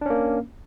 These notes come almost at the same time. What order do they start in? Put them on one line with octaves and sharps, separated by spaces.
D4 C#4 A#3